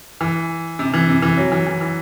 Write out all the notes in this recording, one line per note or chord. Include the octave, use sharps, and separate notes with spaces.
E3
C3
E3
C3
E3
F#3
E3
E3
E3